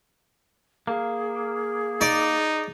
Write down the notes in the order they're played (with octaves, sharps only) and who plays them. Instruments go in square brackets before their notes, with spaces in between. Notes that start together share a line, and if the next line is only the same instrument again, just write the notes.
[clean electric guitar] A#3 [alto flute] G#4
[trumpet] D#4 [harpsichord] D5